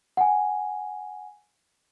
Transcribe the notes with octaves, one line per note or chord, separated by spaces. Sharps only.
F#5 G#5